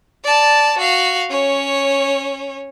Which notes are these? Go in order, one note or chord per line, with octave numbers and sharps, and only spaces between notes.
D5 A5
F#4 F5
C#4 C#5